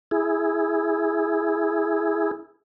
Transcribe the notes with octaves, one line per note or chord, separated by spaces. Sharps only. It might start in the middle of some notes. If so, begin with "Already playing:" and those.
E4 G#4